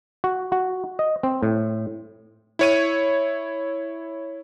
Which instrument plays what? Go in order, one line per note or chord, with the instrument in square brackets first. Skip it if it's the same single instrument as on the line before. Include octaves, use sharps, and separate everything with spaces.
[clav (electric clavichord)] F#4
F#4
D#5
C4
A2
[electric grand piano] E4 C#5 D#7